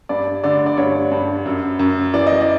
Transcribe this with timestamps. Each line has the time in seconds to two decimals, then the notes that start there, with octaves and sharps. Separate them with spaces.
0.09 G2 D5
0.44 D3 D5
0.66 D5
0.77 G2 C#5
1.11 G2
1.46 F#2
1.79 F#2
2.14 E3 D5
2.27 D#5
2.41 D5